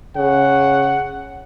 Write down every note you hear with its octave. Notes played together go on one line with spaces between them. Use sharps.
C#3 F#5